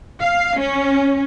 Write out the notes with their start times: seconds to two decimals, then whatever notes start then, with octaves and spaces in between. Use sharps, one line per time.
0.23 F5
0.60 C#4